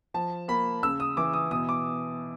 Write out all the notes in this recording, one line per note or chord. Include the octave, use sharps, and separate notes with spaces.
F3 A5
A#3 B5
C#3 E6
D#6
E3 D6
D#6
B2 D#6
D6